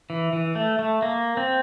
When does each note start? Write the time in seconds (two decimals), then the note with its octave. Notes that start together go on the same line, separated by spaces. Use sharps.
0.10 E3
0.33 E3
0.55 A3
0.79 A3
1.02 A#3
1.37 C4